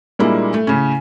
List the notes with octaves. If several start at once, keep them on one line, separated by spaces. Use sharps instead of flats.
A#2 G3 G#3 A#3 D4 E4
A3
A2 C#3 C#4